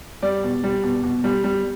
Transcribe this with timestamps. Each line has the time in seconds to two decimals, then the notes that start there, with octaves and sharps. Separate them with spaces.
0.22 G3 D5
0.43 B2
0.64 G3
0.84 B2
1.03 B2
1.24 G3
1.44 G3